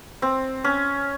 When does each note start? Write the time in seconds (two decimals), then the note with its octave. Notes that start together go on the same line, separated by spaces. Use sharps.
0.22 C4
0.64 C#4